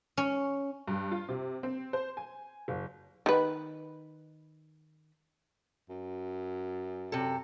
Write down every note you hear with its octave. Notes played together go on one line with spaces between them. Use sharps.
C#4
G2
F4
C3
C4
C5
G#5
F#1
D#3 B4
F#2
C3 A4